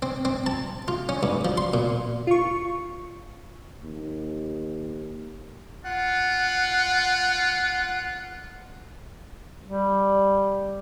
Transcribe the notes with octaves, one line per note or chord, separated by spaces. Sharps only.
C4
C4
A5
F4
C#4
G2
F3
C6
A#2
F4 C#6
D#2
F4 F#5
G3